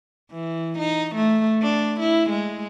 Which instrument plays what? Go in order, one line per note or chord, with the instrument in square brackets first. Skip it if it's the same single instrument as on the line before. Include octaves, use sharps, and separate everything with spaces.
[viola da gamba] E3
D#4
A3
D4
E4
G#3